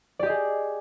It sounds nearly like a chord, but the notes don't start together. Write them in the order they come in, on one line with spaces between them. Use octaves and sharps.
D5 G4 D#5 G#4